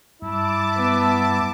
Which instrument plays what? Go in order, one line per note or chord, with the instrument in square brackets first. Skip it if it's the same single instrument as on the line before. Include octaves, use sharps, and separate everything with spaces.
[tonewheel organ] G2 [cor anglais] E4 [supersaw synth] A5 D6
[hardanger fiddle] B3